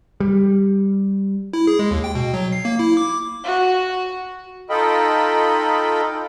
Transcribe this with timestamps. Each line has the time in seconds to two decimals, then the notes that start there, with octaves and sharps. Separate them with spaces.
0.20 G3
1.53 E4
1.67 G#4
1.79 G#3
1.91 D#2
2.04 G5
2.15 B2
2.34 F#3
2.52 C7
2.65 A#3
2.79 E4
2.97 D6
3.44 F#4
4.70 D#4 F4 A4 D#5 G5 B5